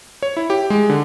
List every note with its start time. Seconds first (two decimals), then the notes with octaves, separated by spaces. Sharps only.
0.23 C#5
0.37 E4
0.50 G4
0.70 G#3
0.90 D3